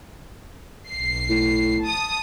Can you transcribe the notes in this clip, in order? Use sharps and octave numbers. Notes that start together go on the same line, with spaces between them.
B1 C7
A2
A5 D#6